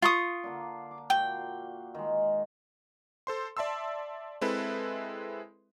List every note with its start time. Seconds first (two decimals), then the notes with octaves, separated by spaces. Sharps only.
0.02 F4 C#6 D#6
0.44 D3 A#3 D4
0.91 D6
1.10 A#2 F#4 F5 G5
1.95 D#3 G#3
3.27 A4 C5 C6
3.57 D5 E5 A5 C6 E6
4.41 G#3 C4 E4 A4 B4 E5